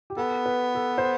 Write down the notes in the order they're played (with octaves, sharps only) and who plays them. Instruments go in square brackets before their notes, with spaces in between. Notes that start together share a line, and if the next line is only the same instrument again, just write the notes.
[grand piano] G4
[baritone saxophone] B3 [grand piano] A4
[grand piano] B4
A4
C5